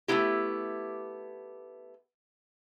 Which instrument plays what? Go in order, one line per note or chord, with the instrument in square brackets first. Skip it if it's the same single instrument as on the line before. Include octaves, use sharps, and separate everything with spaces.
[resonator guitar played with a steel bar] A3 B3 D#4 E4 G4